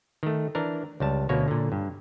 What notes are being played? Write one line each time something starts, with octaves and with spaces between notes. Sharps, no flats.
D#3 A3
E3 D4 A#4
C#2 G3 A5
D2 B2 A#3 C#5
A#2 D3
G2